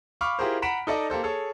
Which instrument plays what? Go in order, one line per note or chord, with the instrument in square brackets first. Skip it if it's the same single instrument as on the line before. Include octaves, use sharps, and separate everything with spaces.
[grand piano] F5 B5 C#6 D6 F6
E4 F4 G4 G#4 A#4 C5
F#5 A#5 B5 B6 D7 E7
D#4 A4 D5 D#5
A#3 G4 A4 C5
G#4 A4 C#5